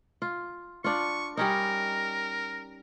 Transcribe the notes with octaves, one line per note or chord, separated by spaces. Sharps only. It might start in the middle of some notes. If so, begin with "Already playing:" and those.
F4
D4 F4 C#6
G3 C#4 D#4 A#4